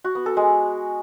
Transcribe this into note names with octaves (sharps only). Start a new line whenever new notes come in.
F#4
B3
A4
G#3